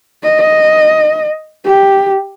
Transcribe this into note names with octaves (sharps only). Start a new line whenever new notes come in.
D#5
G4